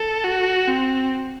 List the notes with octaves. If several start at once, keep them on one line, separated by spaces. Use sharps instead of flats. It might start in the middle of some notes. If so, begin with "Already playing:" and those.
Already playing: A4
F#4
C4